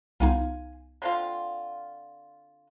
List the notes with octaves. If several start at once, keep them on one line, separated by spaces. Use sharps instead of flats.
C2 B3 D#4 F4 G#5
D3 C4 F4